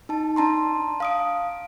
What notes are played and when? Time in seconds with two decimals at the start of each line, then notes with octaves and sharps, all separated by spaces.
0.09 D#4 A5
0.36 D4 A5 A#5 C6
1.00 F5 D#6 D7